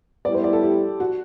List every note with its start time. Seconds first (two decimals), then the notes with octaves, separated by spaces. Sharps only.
0.25 A2 G3 B3 E4 D5
0.34 C5
0.44 D5
0.53 A4
0.63 G4
1.00 F#4